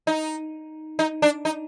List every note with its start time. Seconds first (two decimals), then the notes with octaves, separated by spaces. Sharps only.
0.07 D#4
0.99 D#4
1.22 D4
1.45 D#4